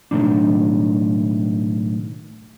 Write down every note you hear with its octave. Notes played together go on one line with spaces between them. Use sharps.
B1 F2 A2 D#3 D4